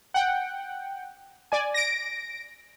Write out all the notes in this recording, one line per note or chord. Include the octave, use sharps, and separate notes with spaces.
F#5 G5
D5 G#5
A#6 D7